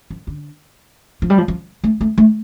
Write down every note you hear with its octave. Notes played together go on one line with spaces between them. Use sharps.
F3
D3
F3
G3
F3
F3
A3
A3
A3